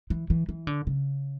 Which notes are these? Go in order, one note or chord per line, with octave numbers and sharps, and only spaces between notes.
E3
E3
E3
D3
C#3